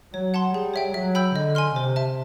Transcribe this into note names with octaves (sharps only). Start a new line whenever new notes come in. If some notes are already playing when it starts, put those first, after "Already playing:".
F#3 C#5
F#5 A5 C6
G3 G#4
C#5 E5 G5
F#3 E5
G5 B5 E6 G6
D3 D#5
G#5 C6 F6
C3 C5
E5 A5